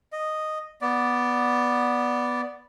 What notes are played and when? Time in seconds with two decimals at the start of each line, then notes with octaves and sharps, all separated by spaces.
0.12 D#5
0.81 B3 D5